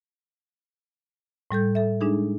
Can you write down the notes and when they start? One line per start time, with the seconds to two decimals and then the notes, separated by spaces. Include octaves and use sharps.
1.51 A2 G3 A4 G6
1.75 A4 E5
2.01 G#3 D4 D#4 G#4